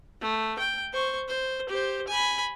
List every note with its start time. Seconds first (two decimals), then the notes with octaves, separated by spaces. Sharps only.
0.21 A3
0.59 G5
0.93 C5 C#6
1.28 C5
1.69 G4 C5
2.08 G#5 B5